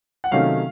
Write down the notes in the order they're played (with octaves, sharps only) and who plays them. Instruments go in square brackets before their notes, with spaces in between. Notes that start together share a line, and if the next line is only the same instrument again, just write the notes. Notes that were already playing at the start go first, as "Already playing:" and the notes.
[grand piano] F#5
C3 D#3 F#3 A3 C#4 F5